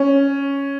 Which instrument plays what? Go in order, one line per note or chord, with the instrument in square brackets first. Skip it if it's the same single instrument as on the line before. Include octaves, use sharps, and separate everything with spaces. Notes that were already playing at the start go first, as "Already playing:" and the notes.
Already playing: [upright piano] C#4